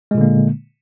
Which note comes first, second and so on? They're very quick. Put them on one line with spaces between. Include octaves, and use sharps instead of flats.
G#3 A#2 D3 A#3